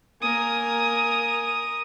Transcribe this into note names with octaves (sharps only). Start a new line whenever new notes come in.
A#3 A#4 G#5 D#6